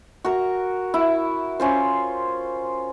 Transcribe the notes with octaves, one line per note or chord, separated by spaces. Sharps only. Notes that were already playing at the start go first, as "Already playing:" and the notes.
F#4 A#4
E4
C#4 F4 C5